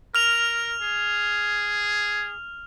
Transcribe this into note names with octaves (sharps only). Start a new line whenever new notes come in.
A#4 F6 F7
G#4